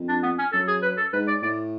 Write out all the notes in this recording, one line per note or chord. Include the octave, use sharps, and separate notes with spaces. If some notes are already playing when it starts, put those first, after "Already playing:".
Already playing: F2
D4
B3
C#4
F#2 A4
G#4
B4
A4
G#2 B4
D5
A2 D5